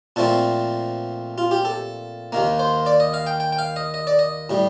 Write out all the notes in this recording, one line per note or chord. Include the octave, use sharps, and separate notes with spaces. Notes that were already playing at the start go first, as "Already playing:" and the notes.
A#2 F3 A3 C4 A4
F4
G4
A4
D#2 D#3 A#3
C5
D5
D#5
F5
G5
G5
G5
F5
D#5
D#5
D5
D#5
A2 G3